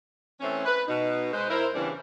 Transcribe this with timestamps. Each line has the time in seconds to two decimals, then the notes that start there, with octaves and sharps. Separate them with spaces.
0.40 E3 A3 C4 C#4
0.66 B4
0.88 B2 D#4
1.33 G#3 B4 C5
1.50 E4 A#4 C5
1.75 E2 C#3 E3 G3 C#4 D4